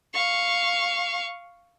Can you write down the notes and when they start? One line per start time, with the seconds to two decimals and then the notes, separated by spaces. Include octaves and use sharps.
0.14 F5 C#6